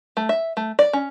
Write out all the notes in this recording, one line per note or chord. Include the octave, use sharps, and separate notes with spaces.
A3
E5
A3
D5
C#4